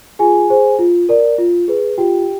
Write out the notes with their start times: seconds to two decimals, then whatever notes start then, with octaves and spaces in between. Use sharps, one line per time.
0.19 F4 G#4 G#5
0.50 G#4 C5
0.79 F4
1.09 A#4 D5
1.38 F4
1.68 G#4 B4
1.98 F4 G4 G5